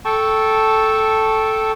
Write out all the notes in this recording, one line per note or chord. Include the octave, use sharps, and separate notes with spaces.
A4 G5 A5 C#6